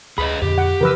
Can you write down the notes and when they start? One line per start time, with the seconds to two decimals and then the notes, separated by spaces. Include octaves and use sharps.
0.18 D2 G#4 B4 D#5 B5
0.42 F2 A#2 D3 G4
0.58 F#5
0.81 C#3 E3 F3 A#4 B4 E6